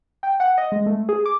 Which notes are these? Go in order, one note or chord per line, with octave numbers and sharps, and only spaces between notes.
G5
F#5
D#5
G#3
A3
G#4
D6